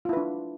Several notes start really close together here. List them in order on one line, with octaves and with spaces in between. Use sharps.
F4 E4 B4 D4